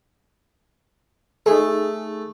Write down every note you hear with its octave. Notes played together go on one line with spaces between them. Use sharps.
A3 D#4 G#4